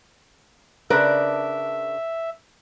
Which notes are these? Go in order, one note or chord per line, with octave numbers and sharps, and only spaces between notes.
C#3 D4 A#4 B4 E5